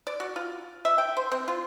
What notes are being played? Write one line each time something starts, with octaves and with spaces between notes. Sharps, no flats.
D5
F#4
F4
E5
G5
C5
C4
F4